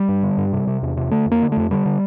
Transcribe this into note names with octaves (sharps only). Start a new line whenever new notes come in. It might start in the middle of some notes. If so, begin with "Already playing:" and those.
Already playing: G3
G2
D3
G2
C3
C3
E2
C3
D3 A3
F2
A#3
D3
F2 A3
D3 G3
D3